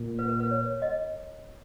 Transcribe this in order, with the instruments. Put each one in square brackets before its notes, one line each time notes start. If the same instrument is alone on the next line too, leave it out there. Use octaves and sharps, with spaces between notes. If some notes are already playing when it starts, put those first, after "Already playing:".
Already playing: [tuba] A#2
[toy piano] B4
A#4
B4
C#5
D#5